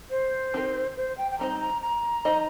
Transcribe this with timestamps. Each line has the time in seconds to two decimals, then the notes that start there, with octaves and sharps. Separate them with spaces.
0.11 C5
0.54 D#3 C4 G4 A#4
0.96 C5
1.18 G5
1.31 G5
1.39 G3 C4 D#4 C5 A#5
1.60 A#5
1.82 A#5
2.25 F3 D#4 C5 D#5